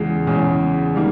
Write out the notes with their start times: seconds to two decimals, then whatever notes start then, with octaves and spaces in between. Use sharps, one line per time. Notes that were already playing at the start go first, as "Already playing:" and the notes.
Already playing: E2 C#3 G#3
0.27 E2 C#3 G#3
0.95 D#3 G3 A#3